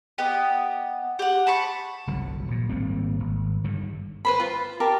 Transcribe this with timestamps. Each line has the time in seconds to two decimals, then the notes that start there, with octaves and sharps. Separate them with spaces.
0.18 B3 G4 D#5
1.19 G4 F#5
1.47 A5 B5 C#6
2.07 G1 C2 D3 F#3
2.48 A#1 A#2
2.69 G#1 G3 A#3 C4
3.20 G#1
3.64 G2 D3 D#3
4.25 B4 C5 B5
4.40 F4
4.80 G4 A#4 A5